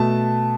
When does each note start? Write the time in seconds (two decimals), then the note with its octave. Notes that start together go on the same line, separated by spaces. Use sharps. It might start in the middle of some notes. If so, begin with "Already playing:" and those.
Already playing: B2 A3 A5